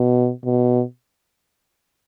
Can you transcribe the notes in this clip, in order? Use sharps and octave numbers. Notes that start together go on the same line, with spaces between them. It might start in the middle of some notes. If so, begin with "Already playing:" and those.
Already playing: B2
B2